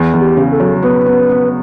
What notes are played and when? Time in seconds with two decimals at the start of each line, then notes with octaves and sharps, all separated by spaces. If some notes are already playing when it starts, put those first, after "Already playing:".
Already playing: E2
0.13 E2
0.21 G4
0.37 C#3
0.52 A4
0.60 F#3
0.83 B3 B4
1.07 B3
1.29 B3